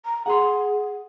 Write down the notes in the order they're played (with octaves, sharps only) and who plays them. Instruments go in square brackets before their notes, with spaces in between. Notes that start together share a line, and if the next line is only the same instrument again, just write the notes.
[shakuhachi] A#5
[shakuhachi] G#4 [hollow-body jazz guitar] F#5 C6